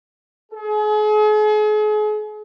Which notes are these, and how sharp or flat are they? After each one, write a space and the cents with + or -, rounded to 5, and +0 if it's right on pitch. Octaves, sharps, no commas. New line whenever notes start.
G#4 +40